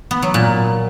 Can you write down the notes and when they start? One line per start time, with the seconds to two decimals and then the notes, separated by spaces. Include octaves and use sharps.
0.11 B3
0.22 F#3
0.34 A#2